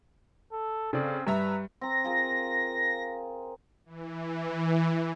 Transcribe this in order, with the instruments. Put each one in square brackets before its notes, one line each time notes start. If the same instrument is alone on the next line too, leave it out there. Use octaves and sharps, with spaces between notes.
[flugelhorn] A4
[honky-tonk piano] C#3 [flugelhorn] C4 [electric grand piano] A4 D5
[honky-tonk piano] G2 E5 A#5 [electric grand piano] G3 [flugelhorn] B4
[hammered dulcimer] C4 A#5 [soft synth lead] A#6
[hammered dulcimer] F4 G#4 A#4
[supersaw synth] E3